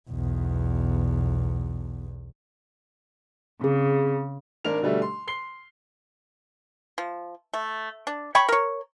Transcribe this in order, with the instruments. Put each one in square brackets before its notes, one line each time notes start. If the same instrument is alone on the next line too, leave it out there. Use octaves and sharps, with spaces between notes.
[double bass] B1 E2
[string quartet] C#3 [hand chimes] C4 G#4
[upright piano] G#1 D4 A#4 F7
B2 D3 G3 A3 D4
C6
C6 C7 G7
[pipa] F3
A3
D4
C#5 G5 B5 C#6
A#4 C#5